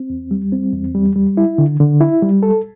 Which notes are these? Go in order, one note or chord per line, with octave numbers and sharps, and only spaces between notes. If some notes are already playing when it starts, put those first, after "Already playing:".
Already playing: C4
E2
G3
C4
E2
G3
G3
E4
D3
D3
E4
G3
A4